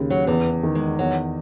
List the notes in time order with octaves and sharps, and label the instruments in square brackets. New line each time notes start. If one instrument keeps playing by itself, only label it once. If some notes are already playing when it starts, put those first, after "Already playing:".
Already playing: [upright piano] D#2 C#3
[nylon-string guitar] F#3
[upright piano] E2 [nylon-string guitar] E3
[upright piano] D#3
[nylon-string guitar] G#3
[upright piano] E2 [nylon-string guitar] F#3